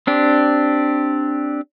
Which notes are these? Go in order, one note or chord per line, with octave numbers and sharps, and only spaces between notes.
C4 D4 G4